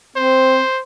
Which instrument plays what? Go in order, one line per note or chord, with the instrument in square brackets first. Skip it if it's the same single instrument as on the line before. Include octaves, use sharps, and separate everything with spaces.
[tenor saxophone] C4 [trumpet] C5